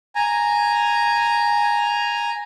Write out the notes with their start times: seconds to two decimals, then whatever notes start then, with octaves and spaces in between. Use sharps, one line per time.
0.15 G#5 A#5